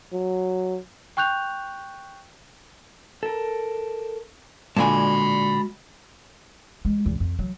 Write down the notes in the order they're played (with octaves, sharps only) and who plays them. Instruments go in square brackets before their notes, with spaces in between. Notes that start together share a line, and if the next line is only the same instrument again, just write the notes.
[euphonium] F#3
[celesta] G5 C#6 F#6 G6 F7
[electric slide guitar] A4 A#4
[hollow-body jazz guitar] A#2 D3 G#5 [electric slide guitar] G#3 F#4 [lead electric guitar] A5 B5
[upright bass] G#3
E2
F2
F#3